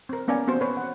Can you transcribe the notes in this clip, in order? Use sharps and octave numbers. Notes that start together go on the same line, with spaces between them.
C4 A#4
A#3 B3 C#4 D5 F5 G#5
B3 C4 F#4 C5
B4 C#5
F#5